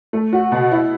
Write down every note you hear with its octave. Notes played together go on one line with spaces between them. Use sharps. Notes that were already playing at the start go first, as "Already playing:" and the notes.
A3
F#4
B2
E4